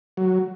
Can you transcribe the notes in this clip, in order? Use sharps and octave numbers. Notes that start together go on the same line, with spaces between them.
F#3